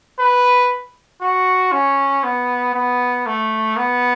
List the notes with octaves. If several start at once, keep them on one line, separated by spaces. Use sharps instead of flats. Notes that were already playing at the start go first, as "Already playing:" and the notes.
B4
F#4
C#4
B3
B3
A3
B3